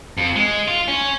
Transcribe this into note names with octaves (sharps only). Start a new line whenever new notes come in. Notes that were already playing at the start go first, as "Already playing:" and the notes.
F2
G#3
F4
C#4